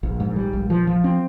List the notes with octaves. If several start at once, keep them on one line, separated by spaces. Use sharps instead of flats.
A#1
G#2
G3
A#1
F3
F3
C4